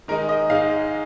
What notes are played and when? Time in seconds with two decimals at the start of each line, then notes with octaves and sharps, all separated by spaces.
0.08 D#3 G#3 D#4 A#4
0.29 D#5
0.50 G#2 G#3 D#4 F5